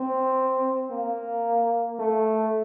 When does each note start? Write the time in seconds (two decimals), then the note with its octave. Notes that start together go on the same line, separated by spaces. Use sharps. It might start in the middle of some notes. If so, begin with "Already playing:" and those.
Already playing: C4
0.91 A#3
1.99 A3